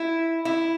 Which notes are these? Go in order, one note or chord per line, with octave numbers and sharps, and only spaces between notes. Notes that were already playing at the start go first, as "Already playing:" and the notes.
Already playing: E4
E4